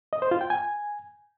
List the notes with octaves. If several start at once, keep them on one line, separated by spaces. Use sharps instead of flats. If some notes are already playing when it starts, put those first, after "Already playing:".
D#5
C5
F4
G5
G#5